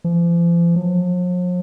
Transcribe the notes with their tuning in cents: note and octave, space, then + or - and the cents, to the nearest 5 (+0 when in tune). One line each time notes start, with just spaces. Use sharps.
F3 -40
F3 +45